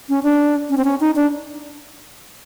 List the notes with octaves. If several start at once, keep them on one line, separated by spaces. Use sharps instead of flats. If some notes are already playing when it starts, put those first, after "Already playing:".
C#4
D4
C#4
C4
C#4
D#4
D4